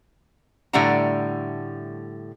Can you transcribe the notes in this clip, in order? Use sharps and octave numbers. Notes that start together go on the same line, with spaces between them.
A2 D3 G3 A3 F#5 A#5